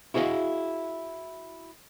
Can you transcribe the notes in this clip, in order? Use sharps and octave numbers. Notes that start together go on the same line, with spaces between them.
E4 F#4 G#4 C#5 D#5 F5